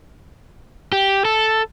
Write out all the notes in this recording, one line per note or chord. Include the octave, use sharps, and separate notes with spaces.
G4
A4